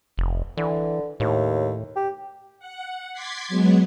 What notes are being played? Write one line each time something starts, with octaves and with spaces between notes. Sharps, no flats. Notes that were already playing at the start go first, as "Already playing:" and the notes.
F1
D3 E3
D#2 A2
G4
F#5
C6 D6 G#6 A6 B6 C7
F#3 G#3 B3